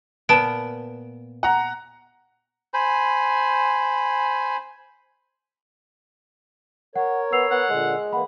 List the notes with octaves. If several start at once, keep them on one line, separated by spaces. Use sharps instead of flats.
A#2 B3 A5 D7
F#5 A#5
C5 G#5 B5
A#4 C#5 F#5
B3 E6 C7 F7
B3 F#5
A#2 D3 G#3
E3 A#3 F#5 B5